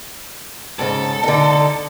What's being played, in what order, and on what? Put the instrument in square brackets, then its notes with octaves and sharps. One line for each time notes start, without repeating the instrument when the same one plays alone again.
[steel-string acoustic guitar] G#2 C#3 [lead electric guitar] A4
[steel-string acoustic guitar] D3 D#4